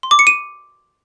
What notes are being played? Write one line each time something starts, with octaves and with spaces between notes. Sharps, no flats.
C6
D6
C#7
D#7